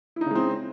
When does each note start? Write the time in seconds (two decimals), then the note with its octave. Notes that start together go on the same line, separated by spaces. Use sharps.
0.16 E4
0.21 D#4
0.26 C#3
0.31 G#3
0.35 C4